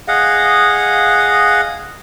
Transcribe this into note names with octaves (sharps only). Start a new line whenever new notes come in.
G#4 D#5 F5 F#5